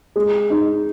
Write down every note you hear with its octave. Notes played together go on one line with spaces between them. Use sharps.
G#3
D#4